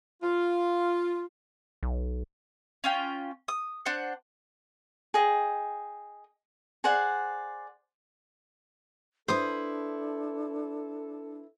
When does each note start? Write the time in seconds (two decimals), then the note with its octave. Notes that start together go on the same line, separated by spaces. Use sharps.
0.22 F4
1.83 B1
2.84 C#4 F4 G5
3.48 D#6
3.86 D4 C5 F#5
5.14 G#4 D#5 G5
6.84 G#4 C5 D5 F#5
9.28 D4 E4 A4 B4 C5 D#6